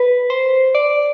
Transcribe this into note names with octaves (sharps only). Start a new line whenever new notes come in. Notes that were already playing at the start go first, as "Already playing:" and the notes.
Already playing: B4
C5
D5